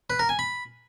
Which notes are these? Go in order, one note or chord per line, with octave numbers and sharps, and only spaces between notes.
B4
A#4
G#5
B5